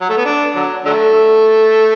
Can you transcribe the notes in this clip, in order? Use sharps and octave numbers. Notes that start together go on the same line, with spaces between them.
F#3
A3
B3
D4
D3 F#3
D3 F#3 A3